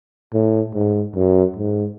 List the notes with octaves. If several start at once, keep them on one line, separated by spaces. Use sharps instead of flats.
A2
G#2
F#2
G#2